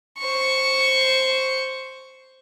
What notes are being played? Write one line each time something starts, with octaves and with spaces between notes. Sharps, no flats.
C5 C#6